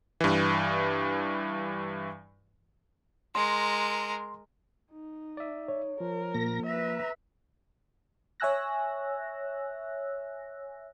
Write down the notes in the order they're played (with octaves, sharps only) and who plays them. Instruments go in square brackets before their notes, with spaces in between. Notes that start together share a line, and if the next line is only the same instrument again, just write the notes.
[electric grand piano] G2 E3
[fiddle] G#3 A#4 [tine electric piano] C6
[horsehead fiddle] D#4
[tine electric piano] D5 E5
[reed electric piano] C#5
[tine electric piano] F3 [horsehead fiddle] A#4
[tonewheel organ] A#2 A#6 [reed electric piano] A#3
[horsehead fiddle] B4 E5 [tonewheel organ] A#5
[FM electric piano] C#5 E5 G#5 E6 F#6 A#6